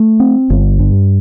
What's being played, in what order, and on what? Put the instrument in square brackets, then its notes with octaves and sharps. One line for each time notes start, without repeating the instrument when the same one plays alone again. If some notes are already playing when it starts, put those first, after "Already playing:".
Already playing: [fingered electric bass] A3
C4
G1
G2